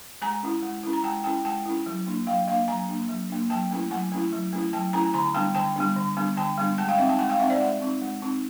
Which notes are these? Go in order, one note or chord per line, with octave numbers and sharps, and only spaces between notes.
G#3 G#5 A#5
C#4 E4
G#3
C#4 E4
A#5
G#3 G5 A5
C#4 E4 G5 A5
G#3 G5 A5
C#4 E4
F#3
A#3 D4
F#3 F5 G5
A#3 D4 D#5 F5
F#3 G#5 A#5
A#3 D4
F#3
A#3 D4
F#3 G5 A5
A3 C#4 E4
F#3 F#5 G#5
A3 C#4 E4
F#3
A3 C#4 E4
F#3 G5 A5
A3 C#4 E4 G#5 A#5
D3 G#5 A#5
G3 B3 D4 G5 A5
D3 G5 A5
G3 B3 D4
D3
G3 B3 D4
D3 G5 A5
G3 B3 D4
G#3 G5 A5
F5 G5
C4 D#4 E5 F#5
G5 A5
G#3 F#5 G#5
F5 G5
C4 D#4 E5 F#5
C5 D5
G#3 E5 F#5
C4 D#4
G#3
C4 D#4